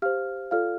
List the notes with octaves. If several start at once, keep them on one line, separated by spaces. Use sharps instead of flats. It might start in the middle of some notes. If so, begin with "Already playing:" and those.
G4 C5 F5 F6
F4 A4 D5 F5 F6